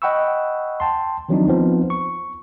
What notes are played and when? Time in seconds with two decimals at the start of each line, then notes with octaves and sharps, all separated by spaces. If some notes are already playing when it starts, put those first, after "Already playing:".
0.02 D#5 F#5 G5 B5 C#6 E6
0.80 G5 A5 C6
1.29 D#3 F3 F#3 C4 D4 D#4
1.47 F3 B3 C4 D#4
1.90 C#6